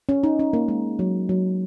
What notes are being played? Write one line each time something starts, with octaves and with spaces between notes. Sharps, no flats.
C#4
D#4
C#4
A#3
G#3
F#3
F#3